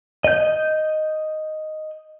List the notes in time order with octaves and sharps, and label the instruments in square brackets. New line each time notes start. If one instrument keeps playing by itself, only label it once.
[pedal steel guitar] D#5 G6